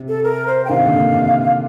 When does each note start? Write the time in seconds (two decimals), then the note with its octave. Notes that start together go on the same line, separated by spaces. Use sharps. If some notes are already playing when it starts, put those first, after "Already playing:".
Already playing: C3
0.08 A4
0.24 A#4
0.47 C5
0.65 G5
0.69 C3 D#3 F5
0.85 A#2 D3
1.00 A#2
1.15 C3